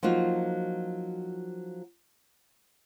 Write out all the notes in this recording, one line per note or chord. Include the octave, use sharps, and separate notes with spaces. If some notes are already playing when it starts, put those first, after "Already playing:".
F3 F#3 A#3 D#4 F4 F#4